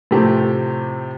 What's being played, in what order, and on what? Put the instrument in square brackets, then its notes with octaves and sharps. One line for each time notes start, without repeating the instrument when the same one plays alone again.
[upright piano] A2 C3 F3 A3 C4 G4